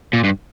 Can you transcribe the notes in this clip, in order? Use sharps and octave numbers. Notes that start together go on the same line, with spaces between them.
A#2
G2